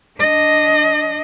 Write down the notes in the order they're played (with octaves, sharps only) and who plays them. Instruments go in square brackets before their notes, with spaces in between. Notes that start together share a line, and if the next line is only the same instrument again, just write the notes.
[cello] D4 D#5